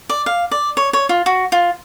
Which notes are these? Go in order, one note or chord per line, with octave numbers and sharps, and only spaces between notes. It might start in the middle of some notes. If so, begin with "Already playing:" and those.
D5
F5
D5
C#5
C#5
F4
F#4
F4